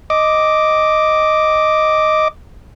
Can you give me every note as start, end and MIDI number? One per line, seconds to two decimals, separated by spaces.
0.10 2.28 75
0.10 2.28 86